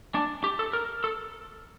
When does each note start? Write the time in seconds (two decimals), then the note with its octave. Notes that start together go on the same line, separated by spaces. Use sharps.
0.15 D4
0.44 G4
0.59 A4
0.73 A#4
1.04 A4